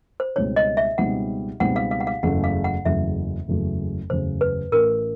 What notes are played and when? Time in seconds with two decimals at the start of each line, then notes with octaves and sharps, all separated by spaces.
0.20 C5
0.36 C#2 B2 G3 C4 D#4 C#5
0.56 D#5
0.77 E5
0.98 C#2 B2 G3 C4 D#4 F#5
1.60 C#2 B2 G3 C4 D#4 F#5
1.76 F5
1.91 F5
2.00 F#5
2.07 F5
2.23 F#1 E2 C#3 F#3 A3 F#5
2.44 F5
2.64 F#5
2.85 F#1 E2 C#3 F#3 A3 E5
3.48 F#1 E2 C#3 F#3 A3
4.10 F#1 E2 C#3 F#3 A3 C5
4.41 B4
4.72 A1 A2 E3 A3 C#4 A#4